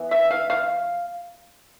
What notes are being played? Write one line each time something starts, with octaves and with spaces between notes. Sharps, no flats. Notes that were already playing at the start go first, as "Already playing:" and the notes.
Already playing: E3 B3
E5
F5
F5